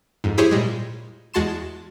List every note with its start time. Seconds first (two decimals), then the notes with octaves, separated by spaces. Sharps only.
0.24 F2 G#2
0.38 E4 G4 G#4 C5 C#5
0.51 A#2 G3 G#3
1.34 E2 G#3 F#4 A5 C6 E7